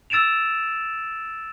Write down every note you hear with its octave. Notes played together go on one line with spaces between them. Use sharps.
E6 A6 D7 E7 F7